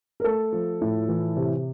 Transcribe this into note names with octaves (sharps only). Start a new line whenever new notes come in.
A#4
A3 A4
F3
A2
E3
C3